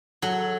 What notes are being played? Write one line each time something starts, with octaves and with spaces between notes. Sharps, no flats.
F#3 A4